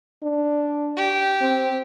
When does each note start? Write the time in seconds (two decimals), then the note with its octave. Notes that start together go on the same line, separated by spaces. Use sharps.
0.23 D4
0.97 G4
1.41 C4